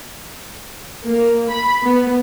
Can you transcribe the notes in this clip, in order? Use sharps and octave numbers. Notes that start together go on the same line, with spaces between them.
A#3
B5
B3